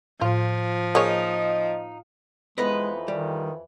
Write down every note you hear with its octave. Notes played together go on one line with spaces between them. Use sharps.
A2 F3 F4
A#3 D#4 G#4 C#5
F2 E3 G#3 B3 D#4 B4
D#3 G3